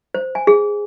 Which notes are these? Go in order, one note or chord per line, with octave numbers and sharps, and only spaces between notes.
C5
G#5
G#4